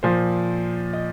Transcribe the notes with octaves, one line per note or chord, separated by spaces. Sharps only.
A#2 F3 C5
D#5